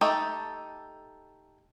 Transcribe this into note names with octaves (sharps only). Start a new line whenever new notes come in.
A3 D#4 G4 A4